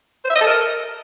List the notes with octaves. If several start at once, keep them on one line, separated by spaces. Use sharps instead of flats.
C5
E5
D#5
A4
A#4